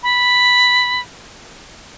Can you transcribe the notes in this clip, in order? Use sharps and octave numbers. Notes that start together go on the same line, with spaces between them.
B5